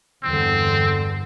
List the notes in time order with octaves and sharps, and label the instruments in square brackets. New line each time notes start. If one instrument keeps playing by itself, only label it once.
[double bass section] E2 G2 [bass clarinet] D3 [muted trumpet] C4